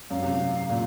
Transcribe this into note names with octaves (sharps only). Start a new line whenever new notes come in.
F#2 F5
C3
C3
A#2